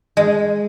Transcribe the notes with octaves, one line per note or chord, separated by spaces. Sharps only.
G#3